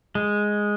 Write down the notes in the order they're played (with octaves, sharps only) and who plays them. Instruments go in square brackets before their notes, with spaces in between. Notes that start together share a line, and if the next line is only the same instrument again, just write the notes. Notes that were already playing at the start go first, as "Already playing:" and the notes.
[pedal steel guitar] G#3